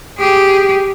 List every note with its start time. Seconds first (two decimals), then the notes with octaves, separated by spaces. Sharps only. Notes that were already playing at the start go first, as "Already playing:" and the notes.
0.18 G4 G#4